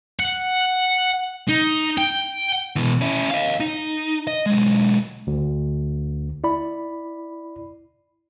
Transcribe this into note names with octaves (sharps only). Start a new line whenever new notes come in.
F#5
D#4
G5
B2 E3
C#4 E4
D#5 F5
D#4
D#5
B1 G#3
D2
E4 D5 B5